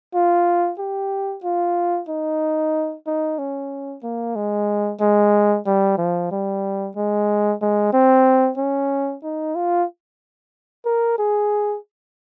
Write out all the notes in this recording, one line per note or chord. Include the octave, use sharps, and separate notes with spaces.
F4
G4
F4
D#4
D#4
C#4
A#3
G#3
G#3
G3
F3
G3
G#3
G#3
C4
C#4
D#4
F4
A#4
G#4